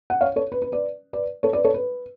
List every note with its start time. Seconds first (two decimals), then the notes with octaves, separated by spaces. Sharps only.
0.10 F#5
0.21 C#5 F5
0.36 A4 C#5
0.52 B4
0.62 B4
0.72 B4 D5
1.13 B4 D5
1.43 A4 C#5
1.53 B4 D5
1.65 A4 C#5
1.74 B4